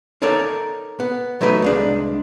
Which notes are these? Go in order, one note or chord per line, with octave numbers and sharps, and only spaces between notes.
D#4 A4 A#4 C#5 D5
B3
F#3 A3 D#4 B4 D#5
C2 G#3 D4